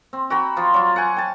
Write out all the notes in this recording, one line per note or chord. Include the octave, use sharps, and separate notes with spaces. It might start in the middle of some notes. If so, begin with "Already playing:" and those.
C4
F#4 G5 A#5 B5
F3 F4
F#3 F4
F#5 G#5
G5 A5